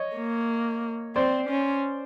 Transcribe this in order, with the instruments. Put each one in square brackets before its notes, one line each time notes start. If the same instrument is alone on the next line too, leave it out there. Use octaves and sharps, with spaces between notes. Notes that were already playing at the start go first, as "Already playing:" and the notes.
Already playing: [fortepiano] C#5 D#5
[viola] A#3
[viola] C4 [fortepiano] C5 D5
[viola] C#4